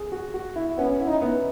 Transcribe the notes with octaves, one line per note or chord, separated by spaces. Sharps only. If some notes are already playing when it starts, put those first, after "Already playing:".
Already playing: G#4
F#4
F#4
E4
B3 C#4
E4
D#4
B3